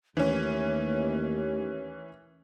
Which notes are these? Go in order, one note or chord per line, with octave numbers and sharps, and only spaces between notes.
D#2 E3 A3 C#4